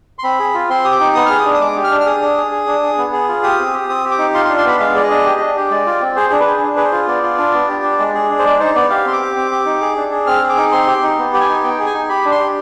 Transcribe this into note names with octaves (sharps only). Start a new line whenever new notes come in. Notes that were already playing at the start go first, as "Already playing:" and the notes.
C6
C4 B5
G#4
F4
C4 C6
G4 D#6
D6
D#4
B3 D#6
G#4 F6
D#6
D4
D#6
G#3 D6
G4
F6
D4
F6
G#4 D#6
D4
G#4
G#4
D4
G#4
B3
G#4
F4
G4 D#6
C4
G4
C4 D#6
G4
D6
D#4
F4 C6
C6
D4
C6
B3 B5
G#3 F5
G#4 D5
D#5
D4
G4
D4
G4
G#3 D5
F4
C4
G#4 C5
D4 G#4
B4
G#4
D4
G#4 B4
C5
F4
B3 D5
F4
D4
B3
G4
D4
G#3
G#4
D4
C5
G#3 D5
D#4 C5
B3 D5
G4 F5
C4 C6
D6
G4
C4
G4
D#4
G#4
D4
G#4
C4 F6
G#4
D6
D#4
C4 C6
G4
D#4
B3
G4
G#5
D#4
B3 G5
G#4
G#5
D#4
G4 B5
D4
C6
G4